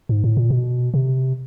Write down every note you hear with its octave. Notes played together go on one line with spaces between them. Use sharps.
G#2
A2
A#2
B2
C3